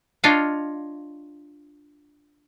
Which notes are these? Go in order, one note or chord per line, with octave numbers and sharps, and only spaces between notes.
D4 F4 C#5 D#5 F5